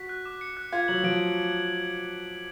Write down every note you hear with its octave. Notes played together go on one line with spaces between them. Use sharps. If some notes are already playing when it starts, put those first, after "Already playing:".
Already playing: F#4 B6
F#6
D6
C#7
F#6
F4 G#6
F#3 F#7
F3 D7